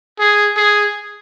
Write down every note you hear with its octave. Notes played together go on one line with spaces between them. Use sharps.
G#4
G#4